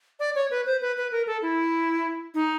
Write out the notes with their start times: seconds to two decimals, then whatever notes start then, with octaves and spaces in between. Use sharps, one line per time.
0.20 D5
0.35 C#5
0.51 B4
0.66 C5
0.81 B4
0.97 B4
1.12 A#4
1.27 A4
1.42 E4
2.34 D#4